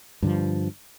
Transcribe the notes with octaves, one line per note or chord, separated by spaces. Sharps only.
G2 D3 D#3 F3